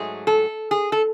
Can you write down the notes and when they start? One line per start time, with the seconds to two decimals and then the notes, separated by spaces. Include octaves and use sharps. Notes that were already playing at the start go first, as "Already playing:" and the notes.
Already playing: G#2 F#3 A3 G#4
0.27 A4
0.71 G#4
0.92 A4